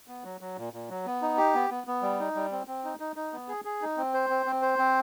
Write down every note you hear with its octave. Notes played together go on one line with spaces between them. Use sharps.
B3
F#3
F#3
A#2
A#2
F#3
B3
D#4
G4
B3
B3
B3
G3
D#4
G3
C4
C4
D#4
D#4
D#4
B3
G#4
G#4
D#4
C4
C5
C4
C4
C5
C4